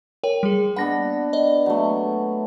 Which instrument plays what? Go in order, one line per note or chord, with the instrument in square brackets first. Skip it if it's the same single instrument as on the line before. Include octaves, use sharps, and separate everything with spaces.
[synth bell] A#4 C#5 G5
G3 G#4
[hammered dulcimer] B3 D4 B4 [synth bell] F#5 A#6
[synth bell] D5 D#5
[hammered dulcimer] F#3 A3